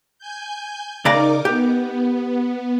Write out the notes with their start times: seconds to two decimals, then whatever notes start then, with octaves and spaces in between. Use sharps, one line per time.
0.18 G#5 G6
1.05 C#3 D#4 A#4 D5 A#5 D6
1.45 B3 G4